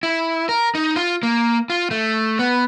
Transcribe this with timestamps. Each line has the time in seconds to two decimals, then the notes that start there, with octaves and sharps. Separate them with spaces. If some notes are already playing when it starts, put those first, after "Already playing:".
0.03 E4
0.49 A#4
0.75 D#4
0.96 F4
1.23 A#3
1.70 F4
1.91 A3
2.39 B3